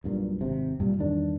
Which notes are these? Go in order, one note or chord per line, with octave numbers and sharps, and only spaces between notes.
B1 G2 A#2
G#1 C3
G2 A#2 G3
E2 G2 D#3 D4